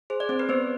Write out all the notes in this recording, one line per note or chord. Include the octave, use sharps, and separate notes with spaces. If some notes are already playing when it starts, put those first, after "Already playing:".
G#4 C5
D5
C4 C5
B4
B3 C5